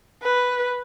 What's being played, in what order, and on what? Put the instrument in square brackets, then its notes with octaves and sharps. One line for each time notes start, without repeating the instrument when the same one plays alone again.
[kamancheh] B4